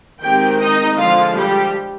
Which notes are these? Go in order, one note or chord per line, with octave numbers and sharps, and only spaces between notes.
D#3 G#3 C4 G4 G5
D#4 D#5
D3 F3 G#3 F4 F5
G3 G4